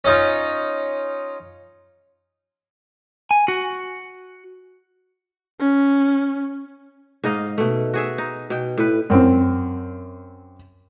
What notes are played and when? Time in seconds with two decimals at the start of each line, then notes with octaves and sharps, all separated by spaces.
0.05 C#4 D#4 F4
3.31 G#5
3.48 F#4
5.61 C#4
7.24 G#2 D#4 D#5 F5
7.58 B2 A3
7.94 F#4 G#4 E5
8.18 D#4
8.50 B2 G5
8.78 A2 B4
9.10 F#2 C4